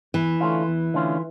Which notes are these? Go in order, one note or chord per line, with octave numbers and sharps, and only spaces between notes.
E2 E3
D3 A3 C#4 F4
E2
D3 A3 C#4 F4